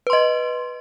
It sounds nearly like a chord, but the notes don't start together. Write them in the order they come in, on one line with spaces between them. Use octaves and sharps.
B4 C6 D#5